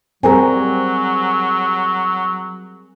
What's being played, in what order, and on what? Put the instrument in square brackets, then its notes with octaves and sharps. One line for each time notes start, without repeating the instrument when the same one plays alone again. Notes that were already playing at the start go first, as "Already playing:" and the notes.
[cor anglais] F#3 [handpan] G3 C4 [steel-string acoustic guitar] G#4 A#4 G#5